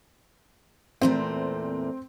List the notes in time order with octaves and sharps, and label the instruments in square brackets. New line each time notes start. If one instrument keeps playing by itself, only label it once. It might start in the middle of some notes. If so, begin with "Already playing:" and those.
[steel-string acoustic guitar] E2 A#2 A3 [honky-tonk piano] C4